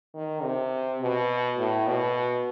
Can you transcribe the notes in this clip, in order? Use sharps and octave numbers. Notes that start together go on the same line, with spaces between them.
D#3
C3
B2
A2
B2